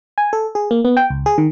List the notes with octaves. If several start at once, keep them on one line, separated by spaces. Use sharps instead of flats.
G#5
A4
G#4
A#3
B3
G5
C#2
G#4
D#3